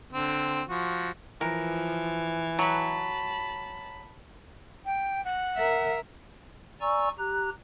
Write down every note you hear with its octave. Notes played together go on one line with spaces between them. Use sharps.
D3 C4
F3 F#4
E3 F3 A#4
F#3 A5 B5
G5
F#5
A#4 E5
D5 G#5 A#5 C#6 E6
G4 A#5 F#6